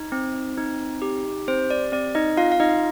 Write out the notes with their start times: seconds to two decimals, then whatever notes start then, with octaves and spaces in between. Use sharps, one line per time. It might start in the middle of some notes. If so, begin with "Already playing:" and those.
Already playing: D#4
0.12 C4
0.57 D#4
1.02 G4
1.48 C4 C5
1.70 D5
1.92 C4 D5
2.15 D#4 D#5
2.37 F4 F5
2.52 F5
2.60 D#4 D#5